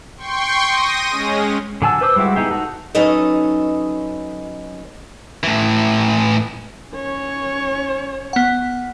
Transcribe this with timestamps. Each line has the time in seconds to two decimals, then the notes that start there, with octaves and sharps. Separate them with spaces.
0.17 G5 C6 C#6
0.66 D#6 A#6 D#7
1.10 G#3 C#4
1.82 D3 F#3 G#5 A5 E6
2.01 B4 C5 D6 E6
2.16 G3 G#3 E4 F#4 G4
2.35 B3 D#4 E4 G4 G#4
2.51 D#4 F#4 A4
2.95 F#3 C#4 D#4 A4 B4 D#5
5.43 A2 E3
6.92 C#4 C#5
8.33 B3 F#5